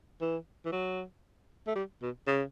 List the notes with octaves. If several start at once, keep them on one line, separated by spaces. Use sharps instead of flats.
E3
E3
F#3
A3
G3
B2
C#3